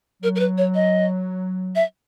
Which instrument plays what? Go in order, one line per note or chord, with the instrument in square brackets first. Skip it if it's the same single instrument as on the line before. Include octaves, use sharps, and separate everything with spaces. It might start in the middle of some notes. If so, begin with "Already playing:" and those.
[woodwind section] F#3 [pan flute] A#4
[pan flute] A#4
B4
C#5
D#5
E5